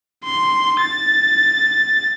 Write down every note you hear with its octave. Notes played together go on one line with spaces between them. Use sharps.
C6
A6